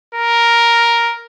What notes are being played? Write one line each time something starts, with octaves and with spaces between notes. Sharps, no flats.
A#4